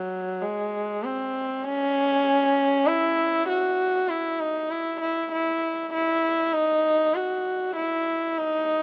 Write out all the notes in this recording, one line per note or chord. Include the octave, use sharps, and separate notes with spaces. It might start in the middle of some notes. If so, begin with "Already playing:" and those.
Already playing: F#3
G#3
C4
C#4
E4
F#4
E4
D#4
E4
E4
E4
E4
D#4
F#4
E4
D#4